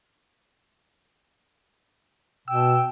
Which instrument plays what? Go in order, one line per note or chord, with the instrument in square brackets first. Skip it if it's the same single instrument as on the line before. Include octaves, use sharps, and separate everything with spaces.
[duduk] B2 [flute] G5 [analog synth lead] E6